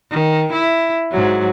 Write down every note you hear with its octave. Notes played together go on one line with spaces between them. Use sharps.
D#3
E4
G#2 F#3